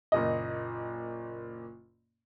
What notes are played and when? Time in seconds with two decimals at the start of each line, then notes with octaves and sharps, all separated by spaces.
0.12 F#1 A#2 D#5